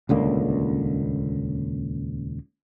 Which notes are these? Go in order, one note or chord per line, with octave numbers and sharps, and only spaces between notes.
D#1 C#2 D3 A#3